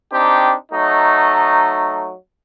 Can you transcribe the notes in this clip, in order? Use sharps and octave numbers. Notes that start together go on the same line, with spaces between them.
C4 D4 D#4 G4
F#3 A3 D#4